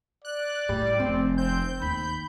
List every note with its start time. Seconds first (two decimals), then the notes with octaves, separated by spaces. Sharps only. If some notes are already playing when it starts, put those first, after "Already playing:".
0.25 D5 F#6
0.69 A2 G3
1.00 F1 F3 C4
1.38 C4 G6
1.82 D#2 B5